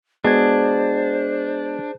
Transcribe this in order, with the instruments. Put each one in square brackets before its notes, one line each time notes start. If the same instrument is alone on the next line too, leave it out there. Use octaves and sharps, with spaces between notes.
[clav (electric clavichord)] G#3 B3 F#4 [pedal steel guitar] D4 [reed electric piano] G#4 G#6 [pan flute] C5